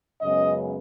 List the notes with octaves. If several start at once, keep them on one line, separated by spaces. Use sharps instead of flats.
F#2 C#3 G#3 B3 D#5